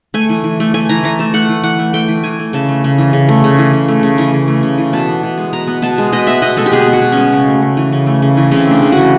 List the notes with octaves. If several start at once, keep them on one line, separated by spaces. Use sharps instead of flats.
A3 G#5
E3
E3
A3
A3 G#5
E3 A#5
E3 A#5
A3 A5
A3 F#5
E3
E3 F#5
A3
A3 G5
E3
E3 G#5
A3
C#3 A5
A3
C#3
E3
C#3
A3
C#3
E3
C#3
A3
C#3
E3
C#3
A3
C#3
E3
B2 A5
B3
B2
G#3
B2 A#5
B3
B2 A5
G#3
B2 D#5
B3 E5
B2 D#5
G#3 A4
G4
B2 G#4
B3
F#4
B2
G#3 C#4
C#3
A3
C#3
E3
C#3
A3
C#3
E3
C#3 C4
A3 D4
C#3
E3 F#4